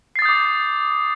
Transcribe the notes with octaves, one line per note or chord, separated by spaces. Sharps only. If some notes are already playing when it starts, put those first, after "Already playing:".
D6 D#6 G6 A6 C7